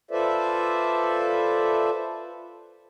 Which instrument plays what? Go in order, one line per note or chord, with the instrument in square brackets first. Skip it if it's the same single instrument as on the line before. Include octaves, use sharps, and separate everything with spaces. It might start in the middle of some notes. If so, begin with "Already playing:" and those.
[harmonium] F4 A4 B4 C5 D5 E5